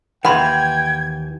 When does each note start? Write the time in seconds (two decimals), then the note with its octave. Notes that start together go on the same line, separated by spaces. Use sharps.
0.25 D#2 E3 F#5 G5 B5 C6 G#6